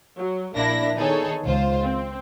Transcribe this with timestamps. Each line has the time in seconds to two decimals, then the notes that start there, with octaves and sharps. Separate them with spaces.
0.17 F#3
0.55 A#1 A#3 D4 E4 A#6
0.95 D#3 B3 D#4 G#4 A4 C#5
1.45 C#2 F4 C5
1.82 C4